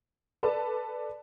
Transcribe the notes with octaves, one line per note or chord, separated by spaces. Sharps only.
A4 B4 D5 A5